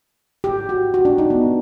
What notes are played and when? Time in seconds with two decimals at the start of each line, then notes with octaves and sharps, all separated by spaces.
0.44 G4
0.69 F#4
0.94 F#4
1.05 D4
1.18 D#4
1.30 B3